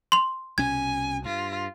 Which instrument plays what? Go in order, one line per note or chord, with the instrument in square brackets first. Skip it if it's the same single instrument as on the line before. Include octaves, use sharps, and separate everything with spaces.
[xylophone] C6 F7
[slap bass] C2 B2 C#4 [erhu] G#5 [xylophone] G#6
[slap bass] G2 [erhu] F4